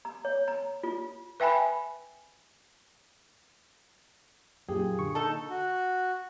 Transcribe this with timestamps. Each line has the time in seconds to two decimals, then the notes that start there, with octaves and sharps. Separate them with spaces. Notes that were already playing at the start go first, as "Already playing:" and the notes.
0.05 A#5
0.25 C#5
0.48 A#5
0.83 F4
1.40 B4 E5 G5 G#5 B5
4.69 F#2 A#2 G4 G#4
4.99 D3 C#6
5.15 D#4 A4
5.50 F#4